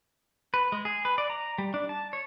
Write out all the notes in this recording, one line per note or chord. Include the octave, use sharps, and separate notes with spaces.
B4
G#3
G#4
B4
D5
A#5
G3
D4
A5
C#5